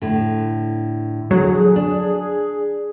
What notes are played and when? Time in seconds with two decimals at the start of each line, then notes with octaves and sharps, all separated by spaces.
0.02 A2 D3
1.31 D3 F#3 G#4
1.76 D4